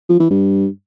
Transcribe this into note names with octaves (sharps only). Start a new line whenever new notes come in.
F3
E3
G2